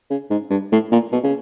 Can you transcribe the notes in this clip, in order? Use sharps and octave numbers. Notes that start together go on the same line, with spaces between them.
C#3
G#2
G2
A2
A#2
B2
C#3